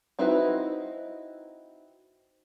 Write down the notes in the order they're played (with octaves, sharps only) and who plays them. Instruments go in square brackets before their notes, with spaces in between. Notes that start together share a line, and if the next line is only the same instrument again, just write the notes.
[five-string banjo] C4 D#4 E4 F#4 B4